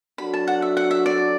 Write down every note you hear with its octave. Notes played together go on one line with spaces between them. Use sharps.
F#3 D4 F#4 A4 B5
A5
F#5
E5
F#5
E5
D5